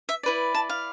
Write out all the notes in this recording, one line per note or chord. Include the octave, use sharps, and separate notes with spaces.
E5
E4 B4 D5
A5
F5